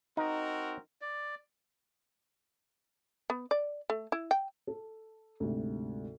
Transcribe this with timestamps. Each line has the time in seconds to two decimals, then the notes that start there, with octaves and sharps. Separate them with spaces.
0.17 C4 D#4 F#4 A#4
1.01 D5
3.30 B3
3.51 D5
3.90 A3
4.12 E4
4.31 G5
4.67 A4
5.40 D2 G#2 C3